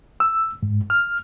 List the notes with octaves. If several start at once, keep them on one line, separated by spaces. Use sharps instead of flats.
E6
G#2
F6